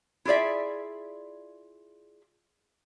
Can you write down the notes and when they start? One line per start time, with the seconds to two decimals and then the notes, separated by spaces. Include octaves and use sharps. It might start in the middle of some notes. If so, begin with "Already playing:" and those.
0.25 E4 F4 G#4 D5 E5